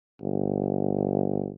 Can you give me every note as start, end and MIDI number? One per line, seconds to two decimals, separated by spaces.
0.21 1.49 31